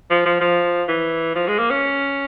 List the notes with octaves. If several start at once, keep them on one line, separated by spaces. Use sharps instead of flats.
F3
F3
F3
E3
F3
G#3
A#3
C#4